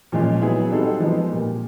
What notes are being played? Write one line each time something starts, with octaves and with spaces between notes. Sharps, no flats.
A#2 F3 G#3 C#4
F#3 B3 E4 G#4
G3 C4 D#4 F#4 A4
F3 G#3 B3 D#4
A#2 G3 A#3